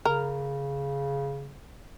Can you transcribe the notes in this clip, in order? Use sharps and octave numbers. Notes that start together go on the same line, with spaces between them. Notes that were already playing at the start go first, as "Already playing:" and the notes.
C#3 A#4